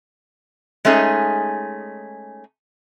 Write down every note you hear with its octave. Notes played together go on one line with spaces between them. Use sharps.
G#3 A3 C#4 D#4 G#4